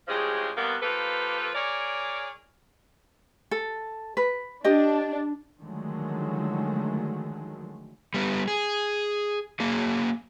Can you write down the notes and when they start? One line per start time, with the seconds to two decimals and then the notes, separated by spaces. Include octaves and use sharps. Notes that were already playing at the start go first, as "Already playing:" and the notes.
0.08 A2 C#3 F3 G#3 G4 G#4
0.56 C3 G3 A#3 B3
0.82 F3 A#3 G4 A4 B4
1.54 G#4 A#4 C#5 D5
3.51 A4
4.17 B4
4.64 D4 G4 D#5
5.61 D3 D#3 F3 F#3 G#3 A3
8.14 G3 B3
8.48 G#4
9.60 F#3 A#3 G#4